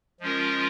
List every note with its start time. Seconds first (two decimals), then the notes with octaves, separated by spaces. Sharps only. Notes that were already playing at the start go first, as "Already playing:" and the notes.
0.20 F3 G#3 C#4 F4 A#4